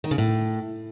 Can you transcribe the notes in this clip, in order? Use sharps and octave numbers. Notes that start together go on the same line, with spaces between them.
D#3
C#3
A2